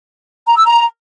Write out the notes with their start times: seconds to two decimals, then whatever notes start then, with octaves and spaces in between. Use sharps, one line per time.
0.48 A#5
0.57 E6
0.66 A#5